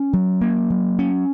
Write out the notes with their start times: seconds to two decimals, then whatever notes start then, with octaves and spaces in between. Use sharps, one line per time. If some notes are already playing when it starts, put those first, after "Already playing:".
Already playing: C#4
0.13 F#3
0.41 A#3
0.70 F#3
0.99 C#4